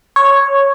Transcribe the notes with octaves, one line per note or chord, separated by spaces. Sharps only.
C#5